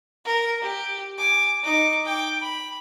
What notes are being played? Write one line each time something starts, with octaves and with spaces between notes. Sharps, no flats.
A#4
G4
G#5 D6
D#4 D6
G5 D6
B5